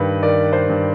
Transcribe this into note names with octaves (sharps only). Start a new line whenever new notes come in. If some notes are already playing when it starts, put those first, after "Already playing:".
Already playing: G2 D#3 B4
D#3 D5
C5
G2